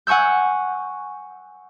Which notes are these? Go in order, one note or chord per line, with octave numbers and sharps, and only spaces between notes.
F#5 G#5 C#6 E6 G6